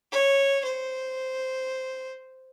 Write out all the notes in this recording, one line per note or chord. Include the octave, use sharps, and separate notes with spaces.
C#5
C5